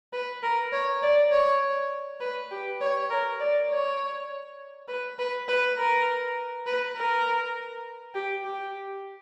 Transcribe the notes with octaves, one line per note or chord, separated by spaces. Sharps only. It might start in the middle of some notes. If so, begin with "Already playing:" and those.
B4
A#4
C#5
D5
C#5
B4
G4
C#5
A#4
D5
C#5
B4
B4
B4
A#4
B4
A#4
G4
G4